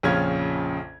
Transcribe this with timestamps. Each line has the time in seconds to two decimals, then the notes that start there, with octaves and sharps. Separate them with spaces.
0.03 A#1 F2 C#3 C#4 F4 G#6